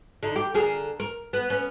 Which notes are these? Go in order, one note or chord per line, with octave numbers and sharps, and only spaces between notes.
D3 D#4
G4
D3 G#4 A#4
A#4
B3
B3 C#4